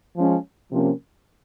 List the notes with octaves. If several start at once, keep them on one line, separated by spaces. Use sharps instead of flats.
F3 G#3 C#4
C3 F3 A#3 C#4